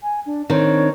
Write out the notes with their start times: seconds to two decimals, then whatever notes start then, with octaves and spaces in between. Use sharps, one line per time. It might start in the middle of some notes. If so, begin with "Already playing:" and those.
0.01 G#5
0.25 D4
0.50 D#3 C4 D4 C#5